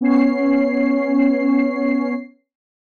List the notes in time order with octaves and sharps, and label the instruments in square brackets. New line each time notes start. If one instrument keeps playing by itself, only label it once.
[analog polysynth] B3 C#4 C#5 C7